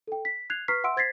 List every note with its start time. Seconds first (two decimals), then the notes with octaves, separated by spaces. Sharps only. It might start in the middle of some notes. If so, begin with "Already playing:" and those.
0.07 A4 G5
0.25 B6
0.50 F#6 G#6 C7 F7
0.68 B4 A#5 C#6 F6 B6 C7
0.84 E5 F#5 C6 E6 D7
0.97 C5 G#6 A6 B6 C7